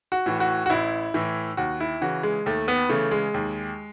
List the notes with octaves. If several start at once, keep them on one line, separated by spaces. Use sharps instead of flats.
F#4
A2 E3
F#4
F#4
A1 E4
A2 E3
D#2 F#4
E4
C#3 E3 F#4
G#3
D#2 A3
B3
C#3 E3 A3
G#3
D#2